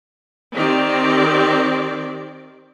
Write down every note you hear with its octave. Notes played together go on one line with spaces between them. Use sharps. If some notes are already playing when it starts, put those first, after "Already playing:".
D#3 C4 G4 D5